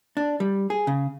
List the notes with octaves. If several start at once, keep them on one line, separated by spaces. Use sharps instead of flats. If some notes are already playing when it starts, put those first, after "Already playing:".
D4
G3
G#4
C#3